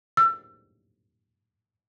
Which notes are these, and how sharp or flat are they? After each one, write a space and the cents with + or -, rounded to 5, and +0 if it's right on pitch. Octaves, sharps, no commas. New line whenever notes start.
E6 +30